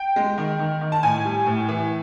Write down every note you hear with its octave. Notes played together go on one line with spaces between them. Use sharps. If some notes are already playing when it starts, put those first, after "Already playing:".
Already playing: G5
G#3
D#3
D#3
D#3
A5
A2 G#5
G3
A2
E3